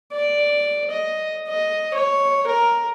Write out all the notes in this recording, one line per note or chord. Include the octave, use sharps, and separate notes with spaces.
D5
D#5
D#5
C#5
A#4